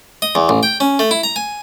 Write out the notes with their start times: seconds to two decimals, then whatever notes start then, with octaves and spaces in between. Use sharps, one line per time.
0.22 D#5
0.35 E2
0.49 A1
0.63 G5
0.80 C#4
0.99 A3
1.11 E4
1.23 A#5
1.36 G#5